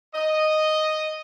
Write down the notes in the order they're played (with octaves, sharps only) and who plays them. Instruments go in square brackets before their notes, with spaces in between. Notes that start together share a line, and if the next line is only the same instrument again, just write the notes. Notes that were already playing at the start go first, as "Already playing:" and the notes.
[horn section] D#5